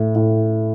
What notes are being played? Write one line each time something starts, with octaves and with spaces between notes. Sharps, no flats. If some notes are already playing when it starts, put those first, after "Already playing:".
Already playing: A2
A2